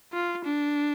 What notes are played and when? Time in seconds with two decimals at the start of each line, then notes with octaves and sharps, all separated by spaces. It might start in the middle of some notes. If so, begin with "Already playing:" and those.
0.13 F4
0.45 D4